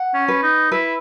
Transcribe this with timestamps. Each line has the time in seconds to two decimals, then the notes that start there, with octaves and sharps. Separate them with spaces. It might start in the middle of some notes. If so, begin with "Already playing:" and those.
Already playing: F#5
0.14 C#4
0.28 B4
0.43 D#4
0.71 E4 B4